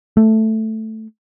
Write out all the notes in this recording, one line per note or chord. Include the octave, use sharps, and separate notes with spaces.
A3